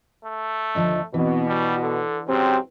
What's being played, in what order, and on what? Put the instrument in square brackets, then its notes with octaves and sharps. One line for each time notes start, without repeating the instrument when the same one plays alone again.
[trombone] A3
[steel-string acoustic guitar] D#2 D3 F3 [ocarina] D#5
[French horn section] B2 [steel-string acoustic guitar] E3 [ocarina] C4
[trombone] G3 [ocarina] F#4
[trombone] D3 [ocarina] A4
[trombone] G#2 [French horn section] C#3 F#3 C4 [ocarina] G4